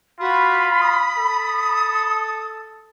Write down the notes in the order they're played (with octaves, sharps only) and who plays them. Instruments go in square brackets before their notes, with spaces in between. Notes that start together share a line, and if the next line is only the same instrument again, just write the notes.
[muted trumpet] F4 [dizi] F#4 [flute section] B5
[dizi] D#6
[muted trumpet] A4